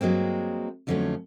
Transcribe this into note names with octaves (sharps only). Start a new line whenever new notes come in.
G2 F#3 G#3 A#3 C4
F2 D3 F3 F#3 A3 C#4